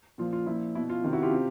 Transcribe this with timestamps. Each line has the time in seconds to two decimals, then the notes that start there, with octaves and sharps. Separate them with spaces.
0.18 A#2 F3 F4
0.33 F4
0.46 A#2 F3 E4
0.75 B2 E4
0.90 F4
1.04 C3 D#3 F4
1.13 E4 F#4
1.22 F4 G4
1.31 C3